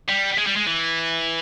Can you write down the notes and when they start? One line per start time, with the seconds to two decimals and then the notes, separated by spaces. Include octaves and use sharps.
0.08 G3
0.38 G#3
0.46 G3
0.56 G#3
0.67 E3